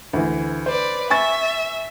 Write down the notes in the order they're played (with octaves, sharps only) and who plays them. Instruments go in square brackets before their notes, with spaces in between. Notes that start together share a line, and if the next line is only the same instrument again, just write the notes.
[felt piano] D2 E3
[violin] B4 D5 [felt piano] C5
[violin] E5 [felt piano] G#5 C#6 A6